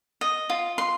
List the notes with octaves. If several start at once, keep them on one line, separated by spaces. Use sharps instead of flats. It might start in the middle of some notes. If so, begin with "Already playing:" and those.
D#5
F4
C6